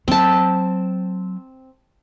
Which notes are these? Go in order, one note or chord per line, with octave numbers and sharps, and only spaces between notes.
F#3 C4 A5